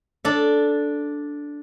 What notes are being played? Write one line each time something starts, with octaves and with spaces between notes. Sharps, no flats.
D4 A4